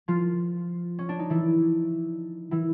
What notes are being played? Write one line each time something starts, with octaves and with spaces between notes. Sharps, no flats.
F3 F4
C#4
D4
D#4
E3 E4
E3 E4